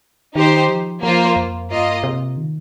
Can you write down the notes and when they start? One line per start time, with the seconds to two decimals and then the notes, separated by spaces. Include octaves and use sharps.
0.35 D#3 D#4 G4 C5
0.69 F3
1.03 F3 A#3 F4 C5
1.36 F2
1.70 G2 A#3 F4 D#5
2.03 C3
2.37 D#3